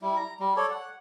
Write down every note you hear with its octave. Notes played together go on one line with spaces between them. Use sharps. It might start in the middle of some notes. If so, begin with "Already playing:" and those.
G3 E4
A#5
G3
A4 C#5 D5
F#5